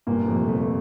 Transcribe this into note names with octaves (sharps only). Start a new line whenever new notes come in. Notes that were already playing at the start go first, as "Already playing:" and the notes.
G1 A#2 A#3
F2 C3 A3
G1 A3